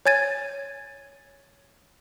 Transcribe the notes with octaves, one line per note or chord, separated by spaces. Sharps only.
C#5 G#5 G#6 A6 D#7